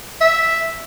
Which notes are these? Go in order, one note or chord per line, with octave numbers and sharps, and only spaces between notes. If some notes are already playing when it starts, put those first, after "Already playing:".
E5